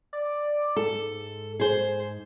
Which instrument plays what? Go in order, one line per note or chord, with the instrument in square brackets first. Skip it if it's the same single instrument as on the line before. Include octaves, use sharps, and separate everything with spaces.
[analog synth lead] D5
[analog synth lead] G#2 [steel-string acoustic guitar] A4
[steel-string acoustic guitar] G#4 C5